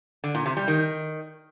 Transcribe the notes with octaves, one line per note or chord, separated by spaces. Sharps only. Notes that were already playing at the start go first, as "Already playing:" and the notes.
D3
A#2
C3
G3
D#3